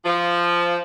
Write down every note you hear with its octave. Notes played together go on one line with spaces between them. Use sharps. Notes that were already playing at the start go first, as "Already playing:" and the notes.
F3